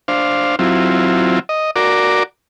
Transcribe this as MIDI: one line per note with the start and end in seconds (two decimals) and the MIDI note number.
0.08 0.56 62
0.08 0.56 72
0.08 0.56 77
0.59 1.39 54
0.59 1.39 60
0.59 1.39 64
0.59 1.39 65
1.49 1.71 75
1.76 2.23 66
1.76 2.23 70
1.76 2.23 74
1.76 2.23 86